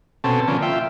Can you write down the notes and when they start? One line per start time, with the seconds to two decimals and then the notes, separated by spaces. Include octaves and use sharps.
0.24 B2 C4 C#4 A4 A5
0.48 D3 F3 A#3 C#4
0.62 F4 E5 G5